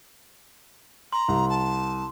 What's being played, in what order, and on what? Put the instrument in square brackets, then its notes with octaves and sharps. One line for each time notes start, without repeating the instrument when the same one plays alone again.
[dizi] A#5 [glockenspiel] C6
[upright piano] C2
[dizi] A5